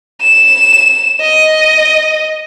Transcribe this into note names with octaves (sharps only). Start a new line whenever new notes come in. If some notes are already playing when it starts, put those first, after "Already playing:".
E7
D#5